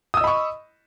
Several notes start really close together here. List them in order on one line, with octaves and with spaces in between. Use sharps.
D#6 E6 D#5 B5 C#6